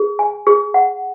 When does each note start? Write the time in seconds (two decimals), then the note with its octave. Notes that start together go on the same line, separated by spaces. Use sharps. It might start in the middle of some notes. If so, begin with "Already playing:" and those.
Already playing: G#4
0.19 G#5
0.47 G#4
0.74 F#5